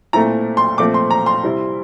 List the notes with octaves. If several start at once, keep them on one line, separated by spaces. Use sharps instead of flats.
A#2 A3 C4 E4 A#5
C6
A#2 F3 A3 C4 D6
C6
A#5
C6
C3 G3 C4 E4